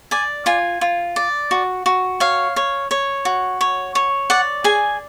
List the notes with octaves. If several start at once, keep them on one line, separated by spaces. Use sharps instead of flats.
D5 G#5
F4 G#5
F4
D5
F#4
F#4
C#5 F5
C#5
C#5
F#4
C#5
C#5
D5 F#5
G#4 G#5